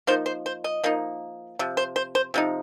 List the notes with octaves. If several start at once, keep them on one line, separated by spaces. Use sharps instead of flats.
F3 A#3 D#4 C5
C5
C5
D#5
F3 A#3 D#4
C3 F3
C5
C5
C5
C3 F3 D#4